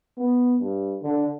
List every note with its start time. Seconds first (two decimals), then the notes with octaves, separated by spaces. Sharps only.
0.17 B3
0.60 G2
1.03 D3